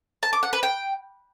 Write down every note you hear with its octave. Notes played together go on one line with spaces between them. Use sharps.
A5
D6
F#5
B4
G5